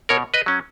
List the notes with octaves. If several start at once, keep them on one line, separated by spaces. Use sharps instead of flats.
B2 A#4 C#5
B4 D#5
F#3 C#4